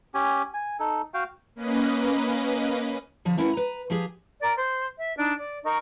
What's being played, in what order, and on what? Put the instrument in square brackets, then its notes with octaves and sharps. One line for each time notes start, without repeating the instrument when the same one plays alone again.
[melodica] C#4 G4 G#5
G#5
D#4 A4
F#4 F5 G5
[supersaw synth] A#3 C#4 B4 D#5
[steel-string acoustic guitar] D3 F3 G3
A3 C#4 E4 A#4 B4 F#5
B4 A#5
F3 G4 G#4
[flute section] A#4 D5
C5
E5
D4 D#4
D5
D#4 A#4 C#6